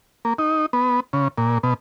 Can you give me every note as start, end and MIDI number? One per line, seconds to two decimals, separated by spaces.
0.25 0.33 58
0.38 0.66 63
0.73 1.00 59
1.13 1.28 49
1.38 1.58 46
1.63 1.74 47